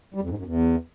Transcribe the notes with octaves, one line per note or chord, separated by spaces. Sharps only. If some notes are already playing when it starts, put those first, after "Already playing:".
G3
F2
G#2
F#2
E2